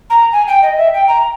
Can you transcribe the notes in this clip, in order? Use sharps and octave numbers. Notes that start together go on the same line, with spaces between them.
A#5
G#5
G5
D#5
E5
G5
A#5